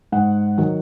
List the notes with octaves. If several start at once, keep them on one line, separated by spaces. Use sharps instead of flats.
G#2 F#5
D#3 F#3